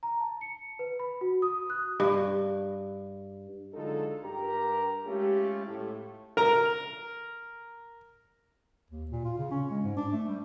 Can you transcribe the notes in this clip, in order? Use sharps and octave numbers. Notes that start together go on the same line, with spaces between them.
A#5
A5
C#7
B4
B5
F#4
D#6
F#6
G2
D3 F#3 G#3 D#4 F4 A4
G2 G4 A#4 A#5
G#3 A3 C#4 F4 G4
A2
A#4 A#5
D#2
A#2
F4
C#3
C#4
G#3
G#2
D4
A3
G3